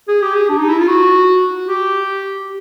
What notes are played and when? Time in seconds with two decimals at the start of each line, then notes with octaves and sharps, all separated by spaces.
0.08 G#4
0.22 G4
0.35 G#4
0.49 D4
0.59 D#4
0.69 E4
0.78 F4
0.88 F#4
1.68 G4